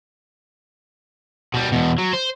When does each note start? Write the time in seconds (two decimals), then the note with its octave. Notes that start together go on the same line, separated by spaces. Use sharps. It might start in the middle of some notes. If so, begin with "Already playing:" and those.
1.54 B2 G3
1.72 E2 B2
1.98 F#3
2.14 C5